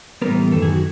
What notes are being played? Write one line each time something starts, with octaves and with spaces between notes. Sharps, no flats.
A2 E3 G3 B3 A#4
F#2 D#3 A4
G#4
F#4